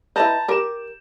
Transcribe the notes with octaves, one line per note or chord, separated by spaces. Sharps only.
E4 B4 D#5 A5 A#5 G6
G4 A#4 D6 E7